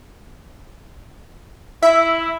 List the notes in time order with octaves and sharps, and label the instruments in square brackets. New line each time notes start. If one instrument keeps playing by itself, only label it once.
[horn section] E4 [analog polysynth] E5